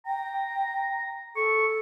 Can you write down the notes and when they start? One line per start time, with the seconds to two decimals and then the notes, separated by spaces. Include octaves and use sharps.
0.06 G5 A#5
1.36 A4 C#6